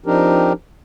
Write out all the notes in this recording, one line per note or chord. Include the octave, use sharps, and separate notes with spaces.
F3 C4 D4 D#4 G4 A#4